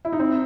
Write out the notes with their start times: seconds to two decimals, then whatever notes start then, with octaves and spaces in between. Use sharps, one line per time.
0.05 E4
0.12 D#4
0.20 C4